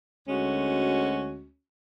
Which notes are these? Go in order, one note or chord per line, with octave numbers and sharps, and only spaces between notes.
D2 G#3 C#4 F#4